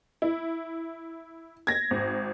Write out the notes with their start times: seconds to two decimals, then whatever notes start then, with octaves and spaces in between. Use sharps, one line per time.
0.22 E4
1.67 G#6 A#6
1.91 G#1